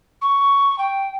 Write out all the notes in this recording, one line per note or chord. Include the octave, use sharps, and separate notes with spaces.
C#6
G5